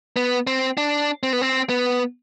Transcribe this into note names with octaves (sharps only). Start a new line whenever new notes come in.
B3
C4
D4
C4
B3
C4
B3